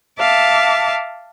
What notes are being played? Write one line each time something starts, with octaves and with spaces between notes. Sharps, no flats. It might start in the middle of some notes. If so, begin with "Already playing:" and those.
E5 F5 A5 D6